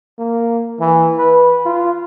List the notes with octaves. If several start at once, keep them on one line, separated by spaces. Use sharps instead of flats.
A#3
E3
B4
F4